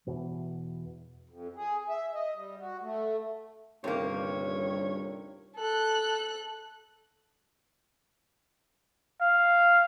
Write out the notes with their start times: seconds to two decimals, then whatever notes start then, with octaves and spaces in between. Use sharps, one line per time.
0.07 E2 B2 E3
1.30 F2
1.56 G#4
1.89 E5
2.14 D#5
2.35 G3
2.60 F#4
2.82 A3
3.84 D#1 D2 G2 C3 A#3 C#5
5.56 A4 F#6
9.21 F5